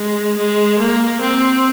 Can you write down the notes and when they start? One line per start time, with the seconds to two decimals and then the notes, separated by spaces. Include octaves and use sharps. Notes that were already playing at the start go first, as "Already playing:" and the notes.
Already playing: G#3
0.38 G#3
0.79 A#3
1.21 C4